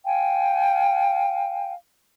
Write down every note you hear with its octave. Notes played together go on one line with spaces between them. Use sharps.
F5 G5 G#5